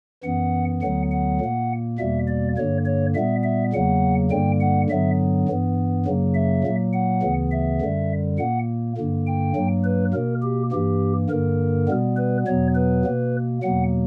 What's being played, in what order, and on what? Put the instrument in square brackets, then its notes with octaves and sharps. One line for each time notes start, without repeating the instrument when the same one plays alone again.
[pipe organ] F#2 E3 B3 F#5
D2 D3 F#3 B3 F#5
F#5
A#2 A#3
E2 B2 G3 A#3 E5
D5
G2 D3 A#3 C#5
C#5
A#2 G3 B3 E5
E5
E2 C#3 F#3 A#3 F#5
G2 D3 G3 A#3 G5
F#5
G2 D3 F#3 B3 E5
G2 E3 B3
F#2 C#3 F#3 A#3
E5
A#2 F#3 A#3
F#5
D2 C#3 E3 B3
E5
F#2 D3 G3
A#2 A#3 F#5
G2 D3 A#3
G5
G2 F#3 A#3
B4
B2 A#3 A#4
G4
G2 E3 A#3 G4
G2 D3 A#3 A#4
B2 G3 B3
B4
E2 B2 F#3 B3 C#5
B4
B2 A#3
E2 B2 F#3 A#3 F#5